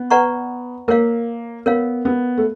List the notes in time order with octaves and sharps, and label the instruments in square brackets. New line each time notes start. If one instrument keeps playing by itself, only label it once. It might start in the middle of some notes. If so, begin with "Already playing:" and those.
Already playing: [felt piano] B3
[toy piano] B4 D5 F#5 A#5 C#6
[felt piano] A#3 [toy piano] A#4 C#5 F5
[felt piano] B3 [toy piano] A#4 C#5 F5
[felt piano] B3
A3